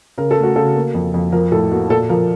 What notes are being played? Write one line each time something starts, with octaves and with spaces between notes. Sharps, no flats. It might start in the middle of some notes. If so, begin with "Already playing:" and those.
C#3 A#4
A4
A3
F#4
C#3 A4
A#3
F2
F2
F3 A#4
A2 A4
A#3 F#4
A#2 A4
F3 A#4